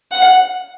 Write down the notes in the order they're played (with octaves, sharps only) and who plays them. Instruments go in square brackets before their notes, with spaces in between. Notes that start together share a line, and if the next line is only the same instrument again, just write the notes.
[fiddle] F#5